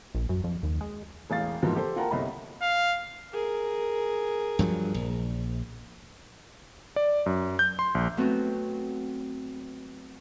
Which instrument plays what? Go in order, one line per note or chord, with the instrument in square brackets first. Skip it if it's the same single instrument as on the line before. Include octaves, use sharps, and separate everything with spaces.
[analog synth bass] A#1
F#2
F2
D#2
G#3
[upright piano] E1 A1 F5 A6
G#2 B2 E3 F3 A#3
G4 A4 C5
F4 A#4 F#5 G5 A5 A#5
G1 C2 D#5 B5
[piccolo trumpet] F5
[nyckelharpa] G#4 A#4
[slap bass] G2 F3 F#3
A#1
[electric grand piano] D5
F#2
G6
C6
A#1
[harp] F#3 A3 B3 C4 F#4